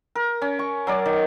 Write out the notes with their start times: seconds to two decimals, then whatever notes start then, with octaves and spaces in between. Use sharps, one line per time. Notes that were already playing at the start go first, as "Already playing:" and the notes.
0.15 A#4
0.42 C#4
0.59 C#6
0.87 F#3 A#4 D5
1.06 D#3